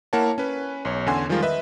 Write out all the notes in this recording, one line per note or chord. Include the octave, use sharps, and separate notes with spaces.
A#3 E4 A#4 C#5 F#5 A5
C#4 B4
B1 C#5
E2 D3 C#4 F#5 G#5 C6
D#3 F3 G3 G#3 F4 A#4
B4 D#5 E5